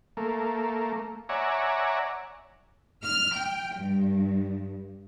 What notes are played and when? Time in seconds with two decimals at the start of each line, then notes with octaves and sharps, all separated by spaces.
0.17 A3 A#3
1.29 C#5 D5 E5 F#5 G#5 A#5
3.04 F6
3.36 G5
3.76 G2